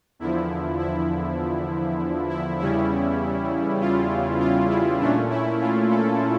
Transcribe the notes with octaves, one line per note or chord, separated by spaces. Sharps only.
E2 D3 F3 E4
E4
E4
E2 C#3 G3 C#4 E4
F4
F4
E4
A#2 A3 C#4 D4
E4
F4
A4